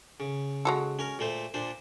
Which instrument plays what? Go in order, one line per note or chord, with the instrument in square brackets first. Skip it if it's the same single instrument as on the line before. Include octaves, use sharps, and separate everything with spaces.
[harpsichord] C#3
[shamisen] G#3 F#4 A4
[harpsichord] C#4 A#4
A#2 A3 C5
A#2 D4 C5